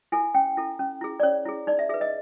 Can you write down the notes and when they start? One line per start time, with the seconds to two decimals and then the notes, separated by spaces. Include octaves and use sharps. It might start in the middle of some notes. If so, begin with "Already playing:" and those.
0.12 E4 A4 G#5
0.34 C#4 G5
0.57 E4 A4
0.79 C#4
1.01 E4 G#4
1.20 D5
1.23 C#4 C#5
1.46 E4 G#4
1.67 D#4 D5
1.79 E5
1.89 G#4 E5
1.94 B4
2.01 D#5